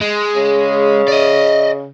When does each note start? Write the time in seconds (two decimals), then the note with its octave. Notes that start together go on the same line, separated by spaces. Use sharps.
0.01 G#3
0.35 C#3
1.08 D5 D#5